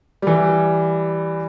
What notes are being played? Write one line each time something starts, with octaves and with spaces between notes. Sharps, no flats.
E3 G3